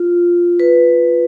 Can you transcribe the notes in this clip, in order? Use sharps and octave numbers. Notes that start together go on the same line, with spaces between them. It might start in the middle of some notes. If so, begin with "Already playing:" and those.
Already playing: F4
B4